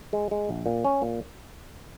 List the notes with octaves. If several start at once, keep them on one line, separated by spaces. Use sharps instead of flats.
G#3
G#3
A#1
A#2
C#4
A#2